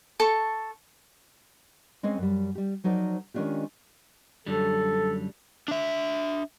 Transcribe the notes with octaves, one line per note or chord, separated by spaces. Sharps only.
A4 C#6
G#3 C4 C#4 G#4 C5 D#5
F#2 G3
G3 G4
F3 F#3 D#4 A#4 C5 D5
D#3 G#3 C#4 D4 F4 G4
F#2 D3 G3 A4
D4 E5